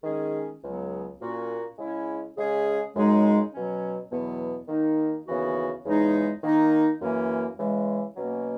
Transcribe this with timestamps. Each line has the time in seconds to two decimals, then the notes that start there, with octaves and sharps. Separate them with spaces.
0.03 D#3 G#3 C#4 G#4
0.62 C#2 C#3 F#3 B3
1.20 A#2 A#3 C#4 F#4
1.77 C#3 G#3 C#4 E4
2.36 C#3 G#3 C#4 G#4
2.93 F#2 C#3 G#3 D#4 G#4
3.52 B2 F#3 C#4
4.10 E2 B2 F#3 B3
4.68 D#3 A#3 D#4
5.26 D#2 C#3 E3 B3 F#4
5.84 E2 C#3 G#3 D#4 G#4
6.42 D#3 A#3 D#4
7.00 F#2 E3 A#3 C#4
7.57 C#3 E3 G#3
8.16 B2 F#3 A#3 C#4